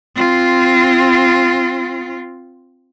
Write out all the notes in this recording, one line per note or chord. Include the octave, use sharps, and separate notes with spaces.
C4 F4